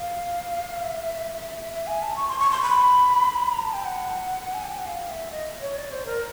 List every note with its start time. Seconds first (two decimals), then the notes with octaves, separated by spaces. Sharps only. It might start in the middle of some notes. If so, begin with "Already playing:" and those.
Already playing: F5
0.82 E5
1.72 E5
1.87 G#5
2.02 A5
2.16 C#6
2.28 C6
2.39 C#6
2.51 C6
2.62 B5
3.52 A#5
3.63 A5
3.73 G5
3.85 F#5
4.54 G#5
4.65 G5
4.76 F#5
4.86 F5
5.09 E5
5.32 D#5
5.61 C#5
5.77 D5
5.91 C5
6.06 A#4